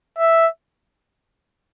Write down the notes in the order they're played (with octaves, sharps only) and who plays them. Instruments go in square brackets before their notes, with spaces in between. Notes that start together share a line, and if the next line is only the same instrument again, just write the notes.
[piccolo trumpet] E5